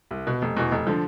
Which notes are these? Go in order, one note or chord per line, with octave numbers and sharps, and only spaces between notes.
C2
B2
F1
E2 B2
F1
D3 F3